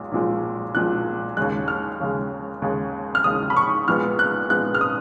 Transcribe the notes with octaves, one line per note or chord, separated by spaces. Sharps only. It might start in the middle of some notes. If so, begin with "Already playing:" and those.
Already playing: B1 A#2 G#3
B1 A#2 F3 G#3
B1 A#2 F3 G#3 F#6
D#2 C#3 G#3 F#6
F6
D#2 C#3 G#3
D#2 C#3 G#3
F6
D#2 C#3 G#3 D#6
B5
C#6
A#1 A#2 G#3 B3 F6
F#6
A#1 A#2 G#3 B3 F#6
F6
D#6